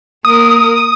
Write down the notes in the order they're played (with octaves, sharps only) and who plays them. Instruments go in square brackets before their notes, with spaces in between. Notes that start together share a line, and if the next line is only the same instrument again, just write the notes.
[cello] A#3 A#4 [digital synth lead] D#6